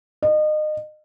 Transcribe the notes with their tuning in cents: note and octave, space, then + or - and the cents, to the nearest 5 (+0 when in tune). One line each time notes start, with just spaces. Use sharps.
D#5 -30